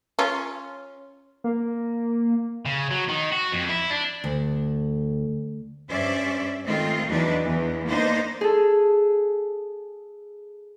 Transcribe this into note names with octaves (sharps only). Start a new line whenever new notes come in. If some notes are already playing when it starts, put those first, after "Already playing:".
C#4 F4
A#3
C#3
F#3
D#3
F#4
F2
E4
D4
D2
G2 C#4 C5 D5 E5
D#3 G#3 A3 C4 F4
E2 F#3 D4 D#4 B4
E2 E3
A#3 B3 D4 D#4 C5
G#4 A4